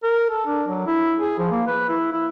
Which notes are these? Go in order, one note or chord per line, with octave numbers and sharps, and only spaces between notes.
A#4
A4
D4
F#3
E4
G#4
F3
A#3
B4
E4
E4